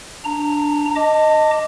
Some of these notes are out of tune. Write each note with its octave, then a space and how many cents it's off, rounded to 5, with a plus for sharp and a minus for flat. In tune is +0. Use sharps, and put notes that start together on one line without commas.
D4 +0 A#5 -20
D#5 +0 A5 +30 D6 +0